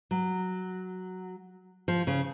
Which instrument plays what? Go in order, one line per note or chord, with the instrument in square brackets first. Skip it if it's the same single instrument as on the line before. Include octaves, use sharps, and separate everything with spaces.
[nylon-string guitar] F#3
F3
C#3